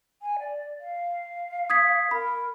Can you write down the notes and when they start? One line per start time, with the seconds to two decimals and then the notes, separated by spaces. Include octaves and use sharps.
0.22 G#5
0.39 D5
0.80 F5
1.70 D#6 G#6 B6
2.11 A#4 B5